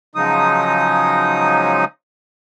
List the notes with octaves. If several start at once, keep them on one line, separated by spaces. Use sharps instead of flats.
C#3 F3 F#3 G#3 D#4 D#6